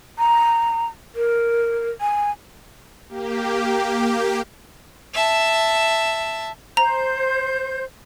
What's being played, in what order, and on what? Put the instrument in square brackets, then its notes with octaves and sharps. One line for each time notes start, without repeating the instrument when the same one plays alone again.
[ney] A#5
A#4
G#5
[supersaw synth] A#3 G4
[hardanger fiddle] E5 A5
[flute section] C5 G6 [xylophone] A#5